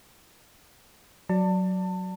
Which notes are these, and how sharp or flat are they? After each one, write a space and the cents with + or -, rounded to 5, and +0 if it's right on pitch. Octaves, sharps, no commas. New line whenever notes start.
F#3 +0 D5 +0 A5 +30